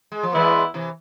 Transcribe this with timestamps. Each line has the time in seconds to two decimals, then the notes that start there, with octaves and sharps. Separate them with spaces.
0.12 G#3
0.23 F3
0.32 E3 G#3 B3 E4 B4 D5
0.74 C3 E3